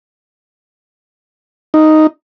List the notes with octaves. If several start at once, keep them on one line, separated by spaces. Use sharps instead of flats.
D#4